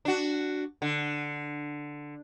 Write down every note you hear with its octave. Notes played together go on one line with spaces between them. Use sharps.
D4 F#4
D3